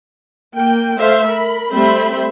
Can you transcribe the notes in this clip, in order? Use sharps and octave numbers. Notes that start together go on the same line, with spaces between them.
A#3 G5
A3 C5 E5 F5
A#4 B5
G3 A3 C4 C5 E5 B5